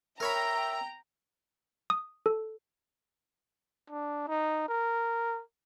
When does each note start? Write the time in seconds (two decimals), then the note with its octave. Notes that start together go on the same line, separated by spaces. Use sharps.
0.20 A#4 C#5 E5 G5 A#5 B5
1.90 D#6
2.26 A4
3.90 D4
4.28 D#4
4.69 A#4